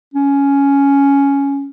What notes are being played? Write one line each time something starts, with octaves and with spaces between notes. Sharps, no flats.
C#4